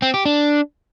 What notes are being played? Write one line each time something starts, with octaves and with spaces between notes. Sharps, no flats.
C4
G4
D4